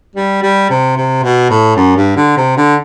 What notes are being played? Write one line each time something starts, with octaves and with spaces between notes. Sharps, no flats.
G3
G3
C3
C3
B2
A2
F#2
G2
D3
C3
D3